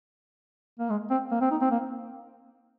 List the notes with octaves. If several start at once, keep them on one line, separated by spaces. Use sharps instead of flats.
A#3
G#3
C4
A#3
C4
D#4
C4
A#3